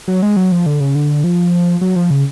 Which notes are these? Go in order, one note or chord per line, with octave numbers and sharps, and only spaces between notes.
F#3
G#3
F#3
F3
D3
C#3
D3
F3
F#3
F3
C#3